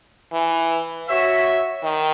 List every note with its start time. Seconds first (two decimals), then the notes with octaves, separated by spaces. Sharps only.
0.33 E3
1.08 F#4 C#5 E5
1.83 D#3